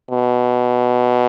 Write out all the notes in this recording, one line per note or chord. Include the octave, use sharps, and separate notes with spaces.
B2